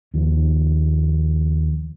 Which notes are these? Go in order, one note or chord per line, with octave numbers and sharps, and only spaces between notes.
D#2 D#3 F3